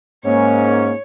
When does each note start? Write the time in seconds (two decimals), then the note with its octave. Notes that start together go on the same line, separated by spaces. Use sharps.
0.25 G#2 A#3 C#4 C#5